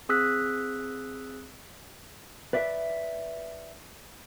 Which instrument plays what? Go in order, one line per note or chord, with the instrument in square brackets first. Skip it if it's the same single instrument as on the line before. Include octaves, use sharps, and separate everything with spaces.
[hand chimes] C4 G#4 D#6 E6 F#6 B6
[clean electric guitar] B4 D5 E5